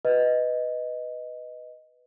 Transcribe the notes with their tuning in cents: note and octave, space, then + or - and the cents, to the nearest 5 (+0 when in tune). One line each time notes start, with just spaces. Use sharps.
B4 +5 D#5 +0